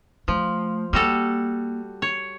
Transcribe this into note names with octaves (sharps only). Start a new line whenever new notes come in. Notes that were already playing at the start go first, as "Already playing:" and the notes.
F3 A3
G3 A#3 F#4 A4
C#5